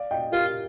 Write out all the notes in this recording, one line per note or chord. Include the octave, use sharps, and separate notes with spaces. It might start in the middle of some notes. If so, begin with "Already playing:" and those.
Already playing: D5 F5
D#5 G5
F4 G4 A#4